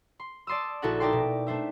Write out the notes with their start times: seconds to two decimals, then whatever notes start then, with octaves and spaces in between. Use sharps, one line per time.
0.20 C6
0.47 D5 A5 C6 D#6 E6
0.82 A#1 E4 F#4 A4 A#4 F#5
1.00 D#4 A#4 D5 E5 G5 C6
1.13 B2
1.47 A3 D4 C5 E5